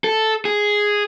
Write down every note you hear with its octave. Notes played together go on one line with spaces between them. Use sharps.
A4
G#4